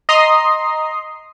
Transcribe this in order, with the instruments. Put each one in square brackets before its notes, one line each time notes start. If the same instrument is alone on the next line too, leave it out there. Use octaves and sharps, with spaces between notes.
[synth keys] D#5 A#5 C6 D#6 C7